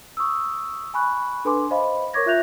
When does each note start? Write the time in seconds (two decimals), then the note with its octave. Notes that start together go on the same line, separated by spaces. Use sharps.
0.17 C#6 D#6 E6
0.94 G#5 B5 C#6 F#6
1.45 D4 A4 B4 G#5 C6 D6
1.71 C5 D#5 F5 B5
2.13 A#4 C#5 C#6 D6 G#6 A#6
2.26 F4 E5 F#6 G6 A#6 F7